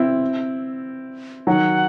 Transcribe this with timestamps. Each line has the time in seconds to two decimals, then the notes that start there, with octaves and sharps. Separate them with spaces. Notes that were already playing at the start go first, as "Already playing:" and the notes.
Already playing: C4 E4
1.47 D#3 F#3 F#5